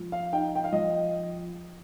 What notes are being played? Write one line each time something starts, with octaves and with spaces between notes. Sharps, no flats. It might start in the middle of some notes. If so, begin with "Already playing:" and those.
Already playing: F3
F5
D#4 G5
G5
F5
F3 D#5